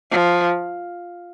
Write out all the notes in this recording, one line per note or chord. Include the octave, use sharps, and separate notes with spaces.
F3